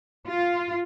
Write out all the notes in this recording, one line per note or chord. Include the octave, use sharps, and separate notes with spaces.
F4